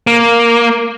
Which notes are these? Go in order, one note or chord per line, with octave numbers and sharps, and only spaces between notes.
A#3